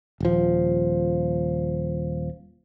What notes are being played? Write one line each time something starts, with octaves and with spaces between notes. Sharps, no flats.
D#1 F3